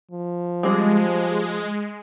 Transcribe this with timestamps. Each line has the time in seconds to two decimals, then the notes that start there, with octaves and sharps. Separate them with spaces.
0.11 F3
0.63 G3 G#3 C4